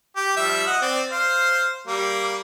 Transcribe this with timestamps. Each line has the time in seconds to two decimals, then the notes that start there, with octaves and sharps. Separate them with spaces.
0.16 G4
0.37 F3 G3 E5
0.67 D#5 F#5
0.82 C4 D5
1.12 C5 F5
1.87 G3 A#3